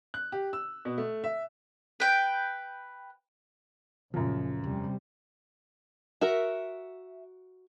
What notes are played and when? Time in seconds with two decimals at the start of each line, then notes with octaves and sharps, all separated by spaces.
0.14 F#6
0.32 G4
0.53 E6
0.85 B2
0.98 A3
1.24 E5
2.00 B4 G5
4.14 C#2 F#2 A#2 F3 A3
4.64 E2 C3 G3
6.21 F#4 A#4 E5